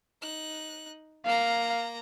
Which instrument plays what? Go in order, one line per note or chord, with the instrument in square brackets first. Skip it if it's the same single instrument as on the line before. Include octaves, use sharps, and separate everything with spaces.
[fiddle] D#4 F#6
[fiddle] A#3 A#5 [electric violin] F5